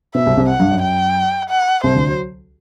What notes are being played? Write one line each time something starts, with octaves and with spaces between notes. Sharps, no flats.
B2 B3 E5
C2 C3
C2 C3
F#5
G2
F#2
G5
F#5
C2 C3 C5
D2 D3
F#3